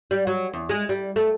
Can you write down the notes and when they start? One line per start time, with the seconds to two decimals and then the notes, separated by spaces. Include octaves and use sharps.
0.11 G3
0.27 F#3
0.53 E2
0.69 G#3
0.89 G3
1.16 A3